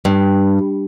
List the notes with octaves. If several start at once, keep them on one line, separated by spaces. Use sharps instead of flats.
G2